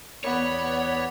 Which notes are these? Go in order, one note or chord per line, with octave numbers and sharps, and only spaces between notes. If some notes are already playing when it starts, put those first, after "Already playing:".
E2 B3 C#5 D5 B5